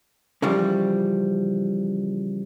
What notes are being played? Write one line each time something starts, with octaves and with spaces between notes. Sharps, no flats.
C#3 E3 F3 G3